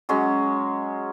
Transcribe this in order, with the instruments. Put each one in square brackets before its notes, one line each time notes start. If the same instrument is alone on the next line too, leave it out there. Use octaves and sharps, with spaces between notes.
[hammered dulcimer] F#3 G#3 C#4